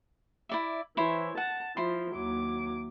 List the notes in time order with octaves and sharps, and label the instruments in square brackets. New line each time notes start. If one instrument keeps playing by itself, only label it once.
[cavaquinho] E4 D5 E5
[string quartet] E3 [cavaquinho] E4 C5 C#5
[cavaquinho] F#5 [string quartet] A5
[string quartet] F3 [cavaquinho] E4 C6
[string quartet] D#2 F#3 D6